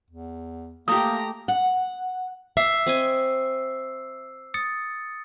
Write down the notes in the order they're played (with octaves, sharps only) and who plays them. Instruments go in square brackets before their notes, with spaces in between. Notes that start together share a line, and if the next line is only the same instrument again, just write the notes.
[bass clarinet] E2
[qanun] A3 G4 [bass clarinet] A#3 [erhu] A#5 [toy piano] D#6
[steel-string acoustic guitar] F#5
[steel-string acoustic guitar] E5 [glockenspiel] D6 E6 C7
[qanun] C4 D#5 G#5
[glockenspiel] D#6 A6 C#7